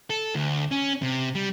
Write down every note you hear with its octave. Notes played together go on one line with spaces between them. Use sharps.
A4
D2
C#4
C3
G3